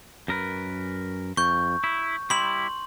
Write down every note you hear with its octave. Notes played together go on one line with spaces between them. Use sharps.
F#2 A#4 B4
F2 C#6 G6
E4
G3 E4 C6 F#7